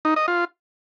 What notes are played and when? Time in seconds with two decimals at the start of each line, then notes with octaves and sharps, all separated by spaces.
0.05 D#4
0.16 D#5
0.28 F4